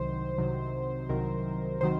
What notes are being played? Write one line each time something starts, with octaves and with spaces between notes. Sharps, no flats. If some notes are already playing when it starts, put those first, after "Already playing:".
Already playing: C2 C3 D#3 F#3 C5
C2 C3 D#3 F#3
C2 C3 D#3 F#3 A#4
C3 D#3 F#3 C5